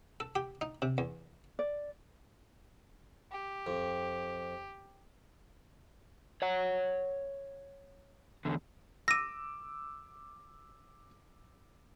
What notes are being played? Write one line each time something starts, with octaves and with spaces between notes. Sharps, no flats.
A4
G4
D#4
C3
E2
D5
G4
F2
C#5 F#5
E2 D3
D6 E6 A#6 D#7